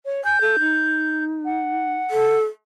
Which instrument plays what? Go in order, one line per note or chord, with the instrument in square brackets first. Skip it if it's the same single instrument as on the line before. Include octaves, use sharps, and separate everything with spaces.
[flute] C#5
[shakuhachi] G#5 [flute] G6
[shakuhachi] A4
D#4
[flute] F#5
[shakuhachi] A4